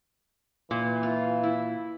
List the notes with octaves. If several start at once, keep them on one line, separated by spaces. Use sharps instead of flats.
A#2 E3
F4
E4